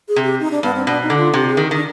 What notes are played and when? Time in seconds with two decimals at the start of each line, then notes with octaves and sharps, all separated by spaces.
0.09 G#4
0.16 C3
0.24 G4
0.40 D#4
0.51 D4
0.63 G2 B3
0.75 C4
0.87 B2 D4
1.02 D#4
1.10 D3
1.18 F4
1.33 C3 G4
1.49 G#4
1.57 D#3
1.71 D#3 D4